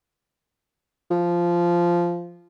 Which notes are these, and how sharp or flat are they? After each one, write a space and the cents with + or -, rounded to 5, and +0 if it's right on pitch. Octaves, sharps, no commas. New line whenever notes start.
F3 -10